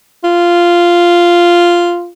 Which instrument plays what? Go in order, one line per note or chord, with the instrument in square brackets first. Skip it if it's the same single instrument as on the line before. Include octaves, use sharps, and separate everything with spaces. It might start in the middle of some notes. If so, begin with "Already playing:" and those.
[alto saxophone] F4